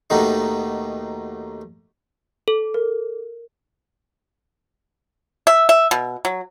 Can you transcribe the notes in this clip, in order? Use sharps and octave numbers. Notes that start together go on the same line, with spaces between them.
D#2 B2 D#3 A3 D#4
A4
A#4
E5
E5
B2
F#3